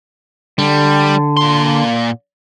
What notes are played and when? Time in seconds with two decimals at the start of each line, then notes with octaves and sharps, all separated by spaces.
0.58 D3 G3
1.37 A#2 C6